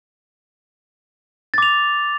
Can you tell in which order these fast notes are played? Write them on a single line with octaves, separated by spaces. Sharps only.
A6 D6 F7